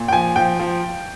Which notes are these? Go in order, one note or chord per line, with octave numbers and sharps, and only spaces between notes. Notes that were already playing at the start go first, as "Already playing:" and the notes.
Already playing: A#2
G5
F3 G#5
F3 G5
F3